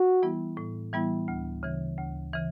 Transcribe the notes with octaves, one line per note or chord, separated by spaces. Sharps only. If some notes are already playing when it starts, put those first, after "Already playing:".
Already playing: F#4
E3 G3 B3 E4
A2
E3 G3 B3 E4
D2
C#3 E3
D2
C#3 E3